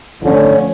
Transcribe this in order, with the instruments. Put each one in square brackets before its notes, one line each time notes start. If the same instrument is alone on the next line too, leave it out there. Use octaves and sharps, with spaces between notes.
[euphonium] D3 [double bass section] F3 A3 C#4